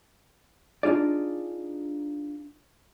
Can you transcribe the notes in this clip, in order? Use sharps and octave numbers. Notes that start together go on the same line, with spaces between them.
D4 D#4 F4 G#4 D5